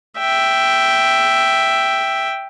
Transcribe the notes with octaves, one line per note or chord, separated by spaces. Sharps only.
E5 G5